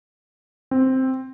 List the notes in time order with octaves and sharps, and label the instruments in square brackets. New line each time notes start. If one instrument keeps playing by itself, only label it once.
[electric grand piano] C4